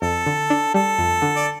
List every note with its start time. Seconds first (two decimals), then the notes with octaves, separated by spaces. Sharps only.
0.02 F2 A4
0.26 D3
0.50 D4
0.74 G3 A4
0.98 F2
1.22 D3
1.36 D5